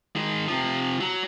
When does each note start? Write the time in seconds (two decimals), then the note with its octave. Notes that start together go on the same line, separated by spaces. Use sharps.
0.16 D#3 G#3
0.48 C3 F3
1.00 F#3